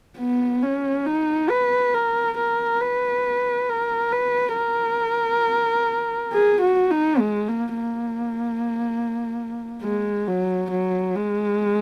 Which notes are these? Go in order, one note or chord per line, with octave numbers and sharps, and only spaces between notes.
B3
C#4
D#4
B4
A#4
A#4
B4
A#4
B4
A#4
G#4
F#4
D#4
G#3
A#3
A#3
G#3
F#3
F#3
G#3